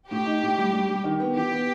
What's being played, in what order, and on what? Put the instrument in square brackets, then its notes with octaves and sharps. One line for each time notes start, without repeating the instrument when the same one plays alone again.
[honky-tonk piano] A2 [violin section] G4
[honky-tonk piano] D#4
A2
G3
G3
G3
D#3
B3
[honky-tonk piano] E3 [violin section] G4
[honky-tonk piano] B3